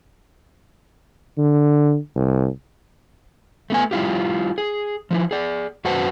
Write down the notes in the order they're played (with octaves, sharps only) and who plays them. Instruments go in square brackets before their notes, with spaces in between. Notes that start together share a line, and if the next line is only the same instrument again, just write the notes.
[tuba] D3
C2
[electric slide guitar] A3 B3 G#5
G3 E4 F4 G4
G#4
F3 D#4 E4
G#4 D5
F#2 F#4 B4 C5 F#5 A5